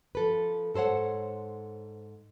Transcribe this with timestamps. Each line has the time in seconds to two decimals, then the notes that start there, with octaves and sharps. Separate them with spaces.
0.15 F3 A4 B4
0.74 G#2 A4 C5 C#5 F#5